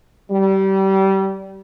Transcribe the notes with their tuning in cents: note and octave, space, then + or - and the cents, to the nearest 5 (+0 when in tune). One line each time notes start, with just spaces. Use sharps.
G3 -25